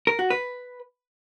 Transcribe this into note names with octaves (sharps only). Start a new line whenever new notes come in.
A#4
F#4
B4